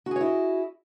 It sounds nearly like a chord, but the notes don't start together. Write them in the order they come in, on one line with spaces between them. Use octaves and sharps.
F#4 G#4 C#5 E4 D#5